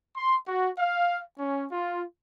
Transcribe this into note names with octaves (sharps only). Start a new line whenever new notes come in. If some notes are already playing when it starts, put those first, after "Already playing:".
C6
F#4
F5
C#4
F4